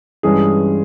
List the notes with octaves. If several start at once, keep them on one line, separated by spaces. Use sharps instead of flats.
G2 E3 G#3 C#4 G#4